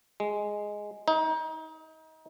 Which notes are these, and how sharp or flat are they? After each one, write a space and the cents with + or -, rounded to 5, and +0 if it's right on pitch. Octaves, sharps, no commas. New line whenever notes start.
G#3 +0
D#4 +30